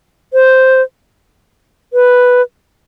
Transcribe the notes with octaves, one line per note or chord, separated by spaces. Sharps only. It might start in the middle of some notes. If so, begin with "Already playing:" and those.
C5
B4